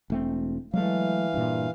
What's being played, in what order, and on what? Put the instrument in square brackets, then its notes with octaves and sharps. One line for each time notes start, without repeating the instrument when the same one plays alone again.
[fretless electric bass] E1 A3 C4
[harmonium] E3 F5 [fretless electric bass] F#3 G#3 A3
[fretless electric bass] G2 A#2